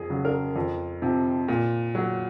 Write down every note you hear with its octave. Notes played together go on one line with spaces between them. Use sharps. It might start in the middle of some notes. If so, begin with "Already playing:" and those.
Already playing: F2 G#4
C#3 F#3
A#4
F2
C3 F3
A#2
F#3